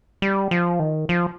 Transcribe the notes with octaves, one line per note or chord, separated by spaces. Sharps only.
G3
F3
D#3
F3